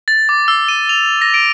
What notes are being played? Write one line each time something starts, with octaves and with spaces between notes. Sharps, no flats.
A6
D6
E6
D#7
F7
A#6
D7